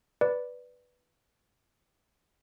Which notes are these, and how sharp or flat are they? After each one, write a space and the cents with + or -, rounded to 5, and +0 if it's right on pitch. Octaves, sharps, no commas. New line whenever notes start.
B4 +0 D5 +0